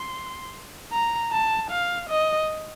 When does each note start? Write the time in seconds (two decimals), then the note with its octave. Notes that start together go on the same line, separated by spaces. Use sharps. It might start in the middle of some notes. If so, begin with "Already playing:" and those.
Already playing: C6
0.92 A#5
1.32 A5
1.71 F5
2.10 D#5